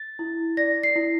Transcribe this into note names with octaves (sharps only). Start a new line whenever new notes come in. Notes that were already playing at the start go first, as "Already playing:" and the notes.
Already playing: A6
E4
D5 A#6
C7
E4